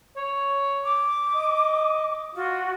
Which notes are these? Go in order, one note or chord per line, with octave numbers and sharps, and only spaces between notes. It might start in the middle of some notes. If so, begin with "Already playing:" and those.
C#5
D6
D#5
F4 F#4